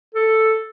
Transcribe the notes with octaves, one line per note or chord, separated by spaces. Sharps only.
A4